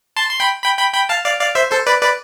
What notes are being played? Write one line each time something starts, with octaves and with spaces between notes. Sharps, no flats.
A5 C6
C6
G5 B5
G5 B5
G5 B5
G5 B5
F5 A5
D5 F5
D5 F5
C5 E5
A4 C5
B4 D5
B4 D5